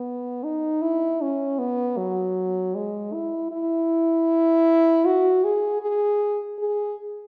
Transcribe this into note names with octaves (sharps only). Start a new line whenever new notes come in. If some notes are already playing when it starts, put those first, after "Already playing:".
Already playing: B3
D#4
E4
C#4
B3
F#3
G#3
E4
E4
F#4
G#4
G#4
G#4